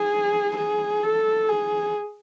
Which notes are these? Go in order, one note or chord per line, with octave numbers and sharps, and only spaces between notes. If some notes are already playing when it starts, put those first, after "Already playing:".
Already playing: G#4
G#4
A4
G#4